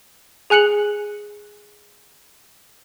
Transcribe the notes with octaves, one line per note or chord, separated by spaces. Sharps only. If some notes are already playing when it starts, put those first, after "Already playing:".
G#4 G#5 F#6 C#7 F#7